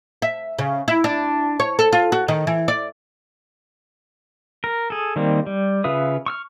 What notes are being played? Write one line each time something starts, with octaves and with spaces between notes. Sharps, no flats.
E5
C#3
E4
D4
C#5
A4
F4
F#4
D#3
E3
D5
A#4
G#4 A4
D#3 G3 A#3 C4
G3
C#3 F4 B4 E5 D#6
C#6 E6 F6